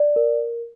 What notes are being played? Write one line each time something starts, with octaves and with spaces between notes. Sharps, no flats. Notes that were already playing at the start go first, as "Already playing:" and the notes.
Already playing: D5
A#4